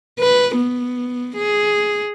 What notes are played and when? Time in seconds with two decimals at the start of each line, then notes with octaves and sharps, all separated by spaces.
0.19 B4
0.56 B3
1.37 G#4